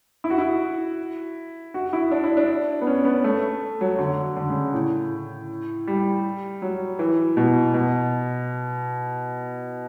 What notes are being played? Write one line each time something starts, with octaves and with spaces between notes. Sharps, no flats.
E4
F#4
E4
F#4
E4
D4
E4
D4
B3
C#4
C#4
B3
A3
F#3
D3
D3
C#3
A2
G3
F#3
E3
B2
B2